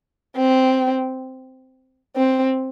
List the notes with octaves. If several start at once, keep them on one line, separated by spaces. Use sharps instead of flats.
C4
C4